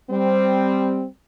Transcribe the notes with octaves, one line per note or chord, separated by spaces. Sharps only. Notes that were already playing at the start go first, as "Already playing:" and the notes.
G3 C4